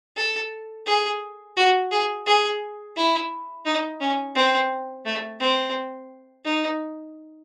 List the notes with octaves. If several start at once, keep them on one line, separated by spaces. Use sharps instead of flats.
A4
G#4
F#4
G#4
G#4
E4
D#4
C#4
C4
A3
C4
D#4